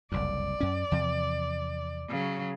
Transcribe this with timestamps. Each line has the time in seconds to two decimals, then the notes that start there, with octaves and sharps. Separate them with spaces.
0.12 F#1 C2 F2 D5
0.60 F#2 C#4
0.91 E2 C3 F3
2.09 C#3 F#3